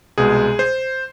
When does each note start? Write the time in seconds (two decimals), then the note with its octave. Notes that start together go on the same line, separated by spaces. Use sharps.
0.18 C2 B2 G#3 G#4
0.59 C5